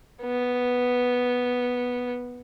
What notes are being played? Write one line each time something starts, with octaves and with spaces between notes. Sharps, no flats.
B3